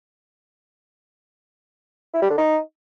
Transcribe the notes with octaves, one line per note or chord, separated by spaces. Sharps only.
E4
G3
D3
D#4